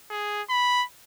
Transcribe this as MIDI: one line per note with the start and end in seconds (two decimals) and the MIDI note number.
0.11 0.42 68
0.50 0.84 83